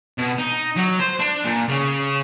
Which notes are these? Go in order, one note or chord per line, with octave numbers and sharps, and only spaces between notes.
B2
D#4
F#3
C5
D4
A#2
C#3